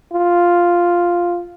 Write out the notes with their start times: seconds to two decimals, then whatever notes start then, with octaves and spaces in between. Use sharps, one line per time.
0.13 F4